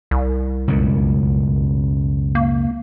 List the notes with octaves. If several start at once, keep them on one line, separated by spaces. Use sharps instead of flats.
C2
C#2 F#2 B2
A#3